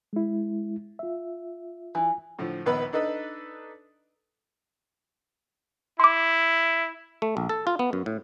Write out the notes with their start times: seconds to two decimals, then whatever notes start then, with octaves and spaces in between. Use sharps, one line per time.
0.13 G#3 E4
0.99 F4 E5
1.95 E3
2.39 A2 D3 F3
2.66 A#1 D#2 B3 B4 B5
2.93 D4 D#4 A4 B4 D#5
6.00 E4 C6 D6
7.22 A3
7.37 A#1
7.49 A4
7.67 F4
7.79 B3
7.93 F#2
8.06 A2